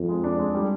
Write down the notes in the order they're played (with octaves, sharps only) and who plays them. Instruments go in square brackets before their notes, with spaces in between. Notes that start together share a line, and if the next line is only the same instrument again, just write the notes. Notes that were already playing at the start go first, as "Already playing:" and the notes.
Already playing: [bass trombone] F2
[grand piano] G#3
D4
G#3
G3